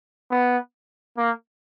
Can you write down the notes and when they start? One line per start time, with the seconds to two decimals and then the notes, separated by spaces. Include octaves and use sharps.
0.31 B3
1.17 A#3